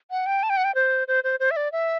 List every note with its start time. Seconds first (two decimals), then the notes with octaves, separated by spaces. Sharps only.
0.11 F#5
0.26 G5
0.43 A5
0.50 G5
0.57 F#5
0.64 G5
0.75 C5
1.08 C5
1.24 C5
1.40 C5
1.51 E5
1.56 D5
1.72 E5